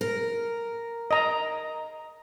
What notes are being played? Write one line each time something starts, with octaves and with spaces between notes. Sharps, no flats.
A#4
D#5 A#5